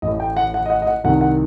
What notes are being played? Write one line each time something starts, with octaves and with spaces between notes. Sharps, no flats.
A1 D#5
A2
G5
F#5
F#5
D#5
F#5
D#5
F#5
C2 C3 D#3 F#5
F#5